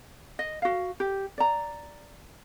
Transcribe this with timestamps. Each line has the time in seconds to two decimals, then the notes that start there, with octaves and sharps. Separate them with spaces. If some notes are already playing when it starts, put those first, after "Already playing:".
0.39 D#5
0.62 F#4 F5
1.00 G4
1.38 D5 A#5